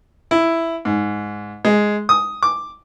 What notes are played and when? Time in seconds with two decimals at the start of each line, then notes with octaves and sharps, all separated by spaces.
0.31 E4
0.85 G#2
1.65 G#3
2.09 D#6
2.43 D6